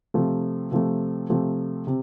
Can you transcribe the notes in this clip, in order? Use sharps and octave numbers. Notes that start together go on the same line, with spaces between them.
C3 F3 A3
C3 F3 A3
C3 F3 A3
C3